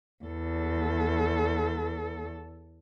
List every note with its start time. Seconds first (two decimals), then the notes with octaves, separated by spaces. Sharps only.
0.25 E2 A4